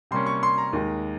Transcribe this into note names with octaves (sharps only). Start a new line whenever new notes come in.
C3 G3 A#3 C#4 C6
C#6
C6
A#5
D#2 D#3 G#3